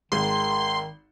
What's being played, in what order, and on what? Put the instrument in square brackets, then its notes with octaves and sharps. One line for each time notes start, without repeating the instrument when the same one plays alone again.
[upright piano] G#1 G#3 [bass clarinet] D#3 [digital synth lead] C6